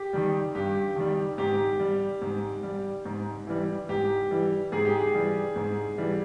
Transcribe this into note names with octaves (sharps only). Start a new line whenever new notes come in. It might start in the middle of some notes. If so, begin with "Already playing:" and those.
Already playing: G4
D#3 G3
G2 G4
D#3 G3
G#2 G4
G3
G#2
G3
G#2
E3 G3
G#2 G4
E3 G3
G#2 G#4
G4
G#4
E3 G3
G#2
E3 G3